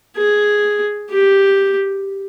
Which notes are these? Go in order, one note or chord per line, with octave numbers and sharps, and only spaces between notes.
G#4
G4